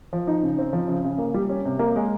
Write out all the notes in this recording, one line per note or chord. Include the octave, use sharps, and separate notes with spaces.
F3
D#4
C#3
C4
F3
C#3
C#3
A#3
G3
C#4
C3
A#3
G#3